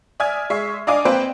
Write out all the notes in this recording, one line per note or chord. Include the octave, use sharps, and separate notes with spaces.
D5 E5 G#5 D#6 F6 G#6
G#3 E5 C#6 C7
D4 D5 D#5 F5 G#5 D6
A#3 C4 B4 C5 G5